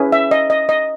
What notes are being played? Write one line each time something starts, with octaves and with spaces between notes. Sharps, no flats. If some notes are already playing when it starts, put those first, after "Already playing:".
Already playing: C#4 E4 G#4 B4
E5
D#5
D#5
D#5